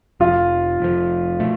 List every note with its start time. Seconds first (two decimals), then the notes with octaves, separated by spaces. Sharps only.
0.20 F1 F2 F3 F4
0.80 F1 F2 F3
1.40 B2 A3